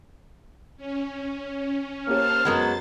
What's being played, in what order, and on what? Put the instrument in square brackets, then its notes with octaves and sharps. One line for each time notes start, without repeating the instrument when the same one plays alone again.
[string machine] C#4
[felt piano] A#3 G4 C#5 [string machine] C5 A5 [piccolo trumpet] F6
[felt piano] F#2 A#4 [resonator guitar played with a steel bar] F#3 G#3 B3 [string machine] A6